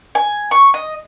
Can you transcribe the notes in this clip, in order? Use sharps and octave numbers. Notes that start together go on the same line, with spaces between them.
G#5
C#6
D#5